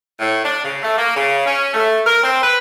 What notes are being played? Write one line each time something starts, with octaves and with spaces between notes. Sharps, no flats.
A2
D4
C#3
A3
A#3
C#3
C#4
A3
A#4
C4
B4